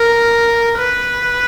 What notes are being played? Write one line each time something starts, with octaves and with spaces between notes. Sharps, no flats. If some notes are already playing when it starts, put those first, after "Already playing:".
Already playing: A#4
B4